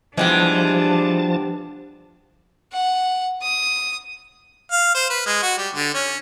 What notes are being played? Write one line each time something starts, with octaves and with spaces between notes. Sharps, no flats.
E3 F3 G3 G#3 B3 D4 G4 A5
F#5
D#6
F5
C5
B4
G#3
F#4
G3
D3
C#4